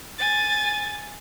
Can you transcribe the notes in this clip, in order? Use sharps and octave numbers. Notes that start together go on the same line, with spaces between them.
G#5 A6